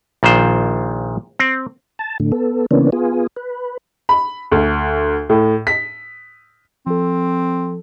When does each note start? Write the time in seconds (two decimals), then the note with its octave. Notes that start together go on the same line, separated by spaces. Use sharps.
0.23 A#1 A#2 D#3 C5
1.39 C4
1.99 A5
2.20 A2 D3
2.32 B3 A4
2.71 C#3 E3 A#3 B3 C#4 D4
2.92 B3 F4 G#4
3.36 B4
4.09 B5
4.51 D2
5.30 A2
5.67 B6
6.86 F3 C4 A4